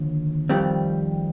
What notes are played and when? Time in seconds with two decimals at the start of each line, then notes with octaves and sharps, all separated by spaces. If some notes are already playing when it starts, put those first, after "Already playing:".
Already playing: D#2 D3 F3
0.49 F2 D#3 G3 C4